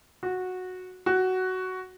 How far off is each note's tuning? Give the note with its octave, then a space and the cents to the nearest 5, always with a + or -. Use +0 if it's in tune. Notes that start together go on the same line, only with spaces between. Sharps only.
F#4 -10
F#4 +10